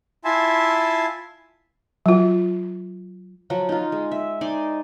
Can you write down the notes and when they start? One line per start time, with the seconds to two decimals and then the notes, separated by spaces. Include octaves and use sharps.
0.25 E4 F4 E5 G#5 A5 C6
2.06 F#3 F4
3.50 F3 F#3 F#4
3.69 D#4 F4
3.92 G#3
4.11 E5
4.41 D#4 C5 D5 G#5